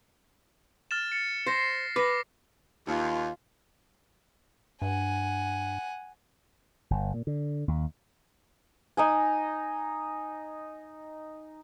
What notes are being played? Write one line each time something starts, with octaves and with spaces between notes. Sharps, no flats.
F6 A6 E7
A6 C#7
C5 A#6 C7
B4 D6 A#6
D#2 F4
G2 F#5 G#5
G1
A#2
D3
D#2
D#4 D#5 G#5